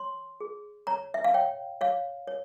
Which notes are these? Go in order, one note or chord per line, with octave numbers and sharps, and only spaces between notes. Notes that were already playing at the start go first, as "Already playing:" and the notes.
Already playing: C#5 C6
G#4
C#5 A#5
E5
F5
C#5 G5
C#5 F5
C#5